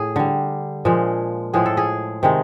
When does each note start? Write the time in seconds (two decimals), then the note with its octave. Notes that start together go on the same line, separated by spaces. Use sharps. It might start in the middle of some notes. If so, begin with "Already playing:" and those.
Already playing: A2 G#4
0.16 D3 G3
0.85 A#2 F3 G#3
1.54 A2 F3 G#3 G#4
1.66 A4
1.77 G#4
2.23 C3 D#3 G#3